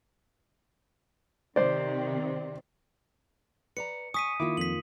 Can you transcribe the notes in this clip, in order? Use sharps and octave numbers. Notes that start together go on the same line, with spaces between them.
C3 D#3 C4 C5 D5
B4 D5 A#5 C#7
G#5 C#6 D#6 B6 D#7
D#3 A#3 E4 F4 D6
F2 B6 F#7